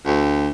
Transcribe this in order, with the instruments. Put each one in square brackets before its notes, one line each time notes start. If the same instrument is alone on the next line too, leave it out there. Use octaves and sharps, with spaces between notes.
[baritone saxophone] D2